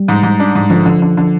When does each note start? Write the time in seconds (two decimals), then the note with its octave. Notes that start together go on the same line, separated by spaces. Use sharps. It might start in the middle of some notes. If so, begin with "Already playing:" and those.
Already playing: G3
0.08 G#2
0.23 G#2
0.39 D4
0.55 G#2
0.70 D3 F3
0.85 D3
1.02 D3
1.17 D3